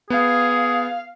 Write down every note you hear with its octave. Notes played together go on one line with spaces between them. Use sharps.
B3 G#4 F5